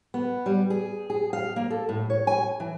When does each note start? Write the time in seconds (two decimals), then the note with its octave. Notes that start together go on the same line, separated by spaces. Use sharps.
0.14 B3
0.46 G3
0.70 G#4
1.10 G#4
1.33 F5
1.56 A#3
1.71 A4
1.89 A2
2.10 C#5
2.27 G#5
2.60 E3